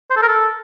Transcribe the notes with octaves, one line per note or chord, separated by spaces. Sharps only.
C5
A4
A#4
A4